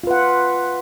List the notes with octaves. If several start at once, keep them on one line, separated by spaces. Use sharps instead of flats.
F4 B4 F#5